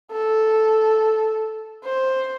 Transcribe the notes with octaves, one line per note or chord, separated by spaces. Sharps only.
A4
C5